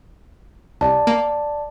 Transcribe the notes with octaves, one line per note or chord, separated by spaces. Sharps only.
C2 D5 A5
A#3